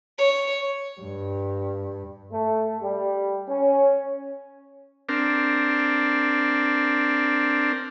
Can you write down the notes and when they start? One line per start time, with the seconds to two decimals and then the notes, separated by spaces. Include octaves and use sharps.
0.18 C#5
1.00 G2
2.31 A3
2.82 G3
3.49 C#4
5.09 C4 D4 A#4